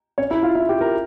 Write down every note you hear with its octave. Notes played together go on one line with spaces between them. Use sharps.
C#4 C#5
E4 E5
F4 F5
E4 E5
G4 G5
A#4 A#5